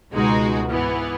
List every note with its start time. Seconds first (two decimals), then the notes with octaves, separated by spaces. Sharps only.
0.12 C#2 B2 G#3 D#4 F#4
0.69 G#2 E3 B3